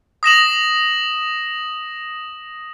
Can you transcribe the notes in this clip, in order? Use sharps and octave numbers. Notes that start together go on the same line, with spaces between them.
D#6 A#6 E7 F#7